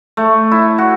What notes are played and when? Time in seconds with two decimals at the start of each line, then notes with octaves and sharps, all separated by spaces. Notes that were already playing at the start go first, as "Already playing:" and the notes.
0.17 A3
0.51 E4
0.78 F#4